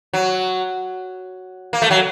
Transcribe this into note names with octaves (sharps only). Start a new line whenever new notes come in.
F#3
A#3
A3
F#3